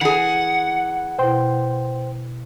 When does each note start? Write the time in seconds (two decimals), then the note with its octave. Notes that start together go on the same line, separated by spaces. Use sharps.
0.01 E3 G#4 F#5
1.19 B2 E4 C5 G5 C6